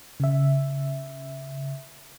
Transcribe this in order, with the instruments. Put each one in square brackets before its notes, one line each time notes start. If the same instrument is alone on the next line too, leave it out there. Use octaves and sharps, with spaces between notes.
[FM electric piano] C#3 E5